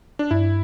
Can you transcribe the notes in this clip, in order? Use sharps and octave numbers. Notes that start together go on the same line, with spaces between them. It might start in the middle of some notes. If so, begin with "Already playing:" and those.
D4
G2 E4